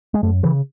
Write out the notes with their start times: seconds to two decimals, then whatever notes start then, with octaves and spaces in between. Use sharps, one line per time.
0.14 G#3
0.23 F#2 A3
0.43 C#3 E3